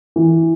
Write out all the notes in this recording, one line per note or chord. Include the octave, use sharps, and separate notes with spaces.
E3